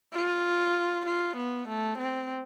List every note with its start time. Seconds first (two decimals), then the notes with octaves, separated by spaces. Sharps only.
0.13 F4
1.06 F4
1.37 B3
1.68 A3
1.98 C4